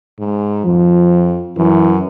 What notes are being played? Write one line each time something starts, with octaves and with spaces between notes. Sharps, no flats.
G#2
F2 F3
F#2 E3